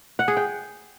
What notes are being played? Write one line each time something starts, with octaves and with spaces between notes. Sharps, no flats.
F#5
G#4
G5